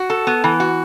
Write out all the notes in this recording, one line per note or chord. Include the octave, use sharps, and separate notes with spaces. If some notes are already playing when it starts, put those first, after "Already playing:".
Already playing: F#4
A4
B3
E3
F#4